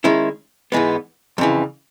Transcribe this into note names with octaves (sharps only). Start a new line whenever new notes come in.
D#3 G#3 C#4 E4
G#2 E3 G#3 B3
F2 C#3 E3